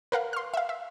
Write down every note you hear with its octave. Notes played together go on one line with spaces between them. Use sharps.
A#4 B4 F5 F#5
C6 F6
E5 F5
E5